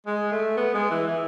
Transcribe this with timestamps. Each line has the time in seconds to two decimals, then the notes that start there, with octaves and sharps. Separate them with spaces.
0.07 G#3
0.32 A3
0.57 B3
0.75 G#3
0.91 E3
1.08 E3